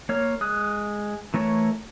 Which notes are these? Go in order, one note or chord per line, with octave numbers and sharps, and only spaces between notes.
A#3 C#5 F6
G#3 D#6 F#6
E3 A3 A#4 C#5